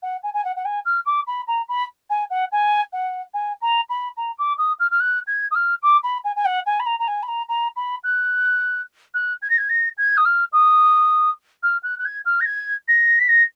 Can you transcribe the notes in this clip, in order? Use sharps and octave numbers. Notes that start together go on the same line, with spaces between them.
F#5
G#5
G#5
F#5
F#5
G#5
F6
D6
B5
A#5
B5
G#5
F#5
G#5
F#5
G#5
A#5
B5
A#5
D6
D#6
F6
F6
F#6
G#6
D#6
F6
D6
B5
G#5
G#5
F#5
G#5
B5
A#5
A#5
G#5
B5
A#5
A#5
B5
F#6
F#6
G#6
A#6
G#6
A#6
G#6
D#6
F6
D#6
F6
F#6
F#6
G#6
F6
A#6
G#6
A#6
B6
A#6